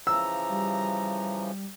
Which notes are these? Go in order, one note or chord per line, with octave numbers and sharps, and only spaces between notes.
C#3 E3 F3 A#5 E6
G3